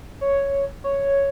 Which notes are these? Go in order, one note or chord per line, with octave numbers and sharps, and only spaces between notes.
C#5
C#5